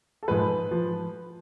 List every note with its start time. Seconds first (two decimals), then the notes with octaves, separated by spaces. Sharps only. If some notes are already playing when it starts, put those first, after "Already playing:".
0.23 A4
0.28 G#2 F3 B4
0.71 F3